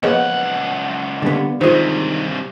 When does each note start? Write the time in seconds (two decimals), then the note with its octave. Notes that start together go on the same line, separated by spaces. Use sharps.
0.03 C#2 F3 A#3 B3 G#4 C#5 D#5 F#5
1.22 D3 G3 A#3 B3
1.61 G2 C3 D#3 G#3 F4 C5